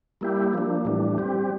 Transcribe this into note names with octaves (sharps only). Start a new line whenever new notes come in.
G3 A#3 E4 G4
F3 A#3 D4
A2 E3 G3 D4
G3 C4 G4